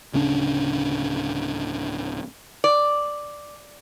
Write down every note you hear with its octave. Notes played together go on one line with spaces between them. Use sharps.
D1 C#3 C#4 D4
D5